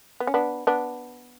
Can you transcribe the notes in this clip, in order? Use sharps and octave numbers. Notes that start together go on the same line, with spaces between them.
B3
C#4
B3 D4
B3 D4